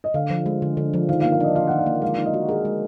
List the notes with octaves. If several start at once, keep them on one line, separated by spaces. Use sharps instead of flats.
D#5
D3 F5
F3
G#3
D3
D3
F3
D#3 F5
F5
A#3
F5
D4 D#5
F4 F5
D#3 F#5
F5
A#3
G#3 F5
D#4
D#5
F#4
G#4 A#4
G#3